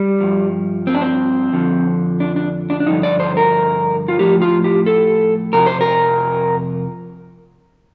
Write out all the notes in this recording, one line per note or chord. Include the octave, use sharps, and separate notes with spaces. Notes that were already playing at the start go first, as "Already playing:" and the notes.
Already playing: G3
G2 F3
C4
D4
C4
F2 D3 F3
D4
D4
D4
D4
G2 D3 F3 D#4
D5
C5
A#4
F4
A2 F3 G4
F4
G4
A4
F2 C3 F3 A#4
C5
A#4